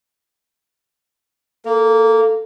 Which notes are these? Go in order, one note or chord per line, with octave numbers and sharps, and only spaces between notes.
A#3 A4